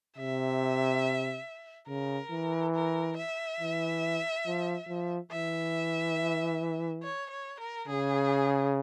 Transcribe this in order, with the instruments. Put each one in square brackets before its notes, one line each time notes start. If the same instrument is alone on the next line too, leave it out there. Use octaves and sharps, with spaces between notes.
[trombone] C3 [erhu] E5
[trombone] C#3 [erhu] A#4
[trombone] E3
[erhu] A#4
E5
[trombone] E3
F3
F3
[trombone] E3 [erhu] E5
[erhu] C#5
C#5
A#4
[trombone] C#3 [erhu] G#4